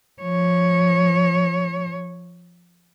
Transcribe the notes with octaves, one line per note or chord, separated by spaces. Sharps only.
F3 C#5